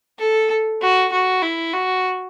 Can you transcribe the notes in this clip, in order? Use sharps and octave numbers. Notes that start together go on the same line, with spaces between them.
A4
F#4
F#4
E4
F#4